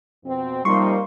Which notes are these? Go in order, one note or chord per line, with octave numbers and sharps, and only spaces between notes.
F2 B2 C4
C3 F3 G3 A#3 D#4 C6 C#6